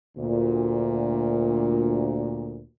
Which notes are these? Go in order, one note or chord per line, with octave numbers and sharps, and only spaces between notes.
D2 A#2